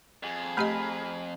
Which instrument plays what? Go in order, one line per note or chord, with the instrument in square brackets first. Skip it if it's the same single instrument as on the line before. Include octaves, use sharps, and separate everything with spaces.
[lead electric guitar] F2 [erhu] G#4
[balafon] A3 G4 D#5 [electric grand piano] A#5 B5 F6